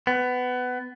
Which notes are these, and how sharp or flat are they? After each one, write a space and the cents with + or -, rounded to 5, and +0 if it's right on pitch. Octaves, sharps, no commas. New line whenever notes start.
B3 +20